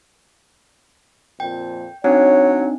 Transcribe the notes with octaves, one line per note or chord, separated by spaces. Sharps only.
F2 A#2 G5
F#3 C4 D4 D#4 C#5